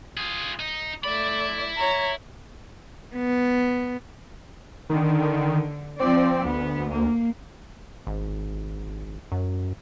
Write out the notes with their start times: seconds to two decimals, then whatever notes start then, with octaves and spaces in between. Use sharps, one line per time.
0.17 F4 G#4
0.60 D#4
1.04 A3 D5 E5 B5
1.78 C#5 A#5
3.16 B3
4.90 D3 D#3
6.00 F3 C4 D5
6.45 D2 B3
6.92 A#3
8.07 G#1
9.32 F#2